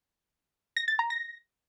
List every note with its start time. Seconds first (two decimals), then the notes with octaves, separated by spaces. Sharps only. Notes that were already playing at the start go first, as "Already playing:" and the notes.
0.77 A#6
0.88 A6
0.99 A#5
1.10 A#6